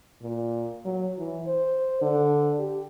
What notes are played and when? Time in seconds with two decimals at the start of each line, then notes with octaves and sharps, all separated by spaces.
0.22 A#2
0.85 F#3
1.18 E3
1.47 C5
2.02 D3
2.59 G4